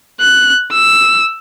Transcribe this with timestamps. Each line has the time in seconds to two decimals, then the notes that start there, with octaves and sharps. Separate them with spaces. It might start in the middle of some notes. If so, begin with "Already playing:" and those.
0.21 F#6
0.73 E6